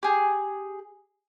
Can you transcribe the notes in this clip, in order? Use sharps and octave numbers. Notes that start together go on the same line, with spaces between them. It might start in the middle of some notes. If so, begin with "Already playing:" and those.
G4 G#4